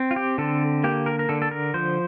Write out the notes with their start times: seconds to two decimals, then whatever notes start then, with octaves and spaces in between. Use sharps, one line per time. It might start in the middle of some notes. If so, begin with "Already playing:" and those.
Already playing: C4
0.11 F4
0.16 G4
0.38 D3 A4
0.84 A#3 G4
1.06 A#4
1.19 A#4
1.29 D3 A4
1.42 A4
1.51 A#4
1.74 F3 C5